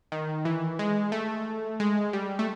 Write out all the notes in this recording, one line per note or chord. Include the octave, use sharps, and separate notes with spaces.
D#3
E3
G#3
A3
G#3
G3
A3